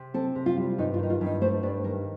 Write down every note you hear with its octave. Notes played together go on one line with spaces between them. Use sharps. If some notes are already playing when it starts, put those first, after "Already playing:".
Already playing: C3
C4 A4
C3
F4
G3
G2 D#4
F4
D#3 D#4
F4
G2
D#4
A3 C5
G2 D5
D#3 A#4